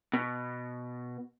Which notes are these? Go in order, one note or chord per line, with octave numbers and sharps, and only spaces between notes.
B2